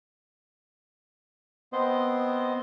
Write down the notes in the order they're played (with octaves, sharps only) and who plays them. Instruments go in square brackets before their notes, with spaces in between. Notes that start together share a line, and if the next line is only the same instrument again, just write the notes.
[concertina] B3 C4 C5 D#5